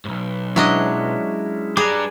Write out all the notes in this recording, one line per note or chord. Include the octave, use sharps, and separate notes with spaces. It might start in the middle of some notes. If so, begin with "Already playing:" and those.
B1 G#2
F#3 G#3 C#4 D4 E4 D#5
G3 D4 G#4 A#5 D6